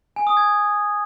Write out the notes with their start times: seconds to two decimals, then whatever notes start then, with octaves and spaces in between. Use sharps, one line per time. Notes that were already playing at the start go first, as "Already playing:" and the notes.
0.16 G#5
0.27 D#6
0.37 G#6